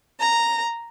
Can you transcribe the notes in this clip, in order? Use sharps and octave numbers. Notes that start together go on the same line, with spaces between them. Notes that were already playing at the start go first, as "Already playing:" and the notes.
A#5